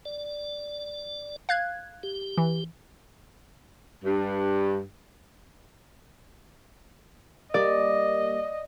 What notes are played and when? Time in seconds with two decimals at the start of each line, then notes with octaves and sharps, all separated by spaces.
0.05 D5
1.49 F5 F#6 G#6
2.03 G4
2.38 E3
4.04 G2
7.54 G3 A#3 D5 D#5